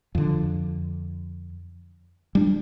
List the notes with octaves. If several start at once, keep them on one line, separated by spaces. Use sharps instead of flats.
F2 D3
G3 D4